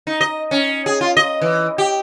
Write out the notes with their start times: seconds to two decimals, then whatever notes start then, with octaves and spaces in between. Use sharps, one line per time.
0.07 D#4
0.21 D#5
0.51 C#4
0.86 G#4
1.01 F4
1.17 D#5
1.41 E3
1.78 G4